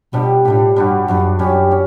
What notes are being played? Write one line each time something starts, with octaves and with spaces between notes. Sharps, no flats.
B2 G3 D4 G4
A2 G3 D4 G4
G2 G3 D4 F#4
F#2 G3 D4 F#4
F#2 G3 C#4 G4
C#4 G4